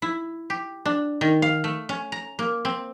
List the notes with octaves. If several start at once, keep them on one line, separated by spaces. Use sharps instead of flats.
E4
G4
D4
D#3
F5
A3
C#4
A#5
A#3
C4